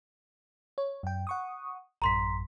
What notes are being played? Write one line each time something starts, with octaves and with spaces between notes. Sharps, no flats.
C#5
F#2 G5
F#5 C#6 D#6
A1 F#2 A#5 C6 B6